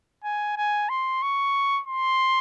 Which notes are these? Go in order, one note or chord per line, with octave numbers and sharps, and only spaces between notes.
G#5
G#5
C6
C#6
C6